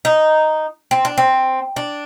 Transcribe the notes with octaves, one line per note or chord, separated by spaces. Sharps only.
D#4
C4
D4
C4
D4